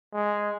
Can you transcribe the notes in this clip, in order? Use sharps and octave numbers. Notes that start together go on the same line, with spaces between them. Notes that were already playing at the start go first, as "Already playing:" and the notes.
G#3